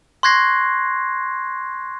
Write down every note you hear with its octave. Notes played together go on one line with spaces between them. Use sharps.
C6 C#6 F#6 G#6 A#6 C7